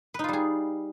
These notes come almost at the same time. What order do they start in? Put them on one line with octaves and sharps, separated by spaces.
B4 D#4 F4 G3 G#4